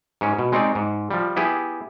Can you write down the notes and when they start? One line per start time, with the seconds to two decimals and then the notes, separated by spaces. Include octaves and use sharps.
0.21 G#2 C#4
0.38 B2
0.52 G#3 C4 D#4 C#5 D5
0.75 G#2
1.11 F3 G3
1.36 B3 E4 G4 G#4